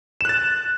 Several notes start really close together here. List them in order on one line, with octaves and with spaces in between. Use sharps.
E7 F#6 A6